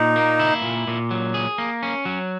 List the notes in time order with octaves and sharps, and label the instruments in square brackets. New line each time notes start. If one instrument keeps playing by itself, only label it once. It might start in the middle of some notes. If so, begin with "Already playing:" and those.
Already playing: [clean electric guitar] A#2 [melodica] D#4
[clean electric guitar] A#3
E4
A#2
A#2
F#3
G#4
A#3
C#4
F#3